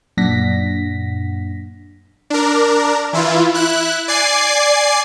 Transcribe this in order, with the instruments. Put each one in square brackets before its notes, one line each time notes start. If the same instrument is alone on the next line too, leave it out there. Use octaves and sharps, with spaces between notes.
[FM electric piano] F#2 A#2 D4 F#5 A#6 B6
[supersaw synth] D4 A#4
E3 E4 F4
E4 F#6
D5 G#5 C7